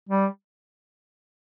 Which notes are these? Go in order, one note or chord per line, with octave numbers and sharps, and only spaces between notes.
G3